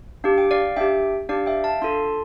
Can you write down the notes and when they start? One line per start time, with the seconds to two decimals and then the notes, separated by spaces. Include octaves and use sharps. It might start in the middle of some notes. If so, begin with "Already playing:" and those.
0.24 D4 G4 F5
0.38 G5
0.51 D5 F5
0.76 D4 G4 E5 G5
1.29 D4 G4 D5 F5
1.46 E5 G5
1.64 F5 A5
1.82 D4 F4 A4 A5 C6